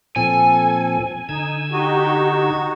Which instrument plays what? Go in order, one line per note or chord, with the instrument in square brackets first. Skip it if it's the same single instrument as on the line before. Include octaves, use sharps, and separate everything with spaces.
[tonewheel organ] A#2 F3 C4 [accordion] A4 [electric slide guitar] G#5
[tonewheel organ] D3 E6 G#6 [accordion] D#4
[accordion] D#4 F#4 [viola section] G4